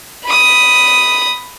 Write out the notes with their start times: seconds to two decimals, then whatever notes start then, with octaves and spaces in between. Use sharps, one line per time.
0.25 B5 D#6